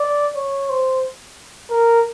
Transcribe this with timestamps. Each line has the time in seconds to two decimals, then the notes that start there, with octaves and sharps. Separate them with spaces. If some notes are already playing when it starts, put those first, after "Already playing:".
Already playing: D5
0.36 C#5
0.69 C5
1.70 A#4